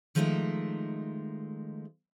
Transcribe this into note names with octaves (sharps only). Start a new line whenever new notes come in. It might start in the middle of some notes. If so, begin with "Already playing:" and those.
D#3 F3 G#3 A3 D#4 E5